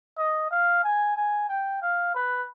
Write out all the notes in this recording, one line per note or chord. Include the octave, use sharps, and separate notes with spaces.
D#5
F5
G#5
G#5
G5
F5
B4